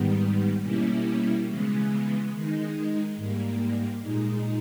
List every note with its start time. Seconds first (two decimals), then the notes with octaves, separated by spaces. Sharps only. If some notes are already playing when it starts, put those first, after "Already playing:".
Already playing: G#2 D#3 G3 B3
0.63 B2 G3 A#3 C#4 E4
1.48 C#3 E3 G#3 B3
2.31 D#3 G#3 D#4
3.16 G#2 G3 A#3
4.00 A#2 G#3 D#4